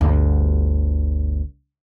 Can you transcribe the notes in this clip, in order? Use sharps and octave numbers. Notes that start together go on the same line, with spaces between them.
G1 D2